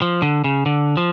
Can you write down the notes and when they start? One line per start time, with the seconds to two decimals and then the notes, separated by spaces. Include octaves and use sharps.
0.02 F3
0.22 D3
0.44 C#3
0.66 D3
0.97 F3